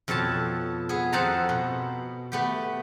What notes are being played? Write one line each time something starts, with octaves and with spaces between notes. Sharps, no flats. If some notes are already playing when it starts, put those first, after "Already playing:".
F2 B2 A4 C#5 A5
B3 G#4
F2 A4 C5 F#5 A5 A#5
B2
A3 B3 G4